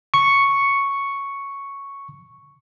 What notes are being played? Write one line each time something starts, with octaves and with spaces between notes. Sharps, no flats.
C#6 C#7